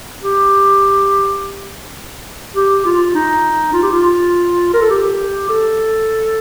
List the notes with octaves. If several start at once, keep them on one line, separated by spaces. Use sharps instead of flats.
G4
G4
F4
D#4
F4
G4
F4
A#4
A4
G4
A4